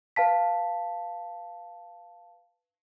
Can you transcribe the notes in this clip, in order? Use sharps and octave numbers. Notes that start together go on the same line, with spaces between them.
B4 F5 A5 B6